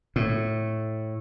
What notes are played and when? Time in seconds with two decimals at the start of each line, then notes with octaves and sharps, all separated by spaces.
0.16 A2